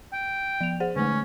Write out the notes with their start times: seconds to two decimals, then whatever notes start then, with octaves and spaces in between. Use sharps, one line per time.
0.13 G5
0.61 F3 F7
0.80 G#4 C5 F#5
0.96 D3 A3 C#4